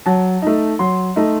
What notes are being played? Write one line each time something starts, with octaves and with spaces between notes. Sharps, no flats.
F#3 A5
A3 D#4
F#3 C6
A3 D#4